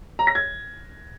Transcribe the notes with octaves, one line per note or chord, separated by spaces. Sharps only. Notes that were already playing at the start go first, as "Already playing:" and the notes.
A#5
A#6
G#6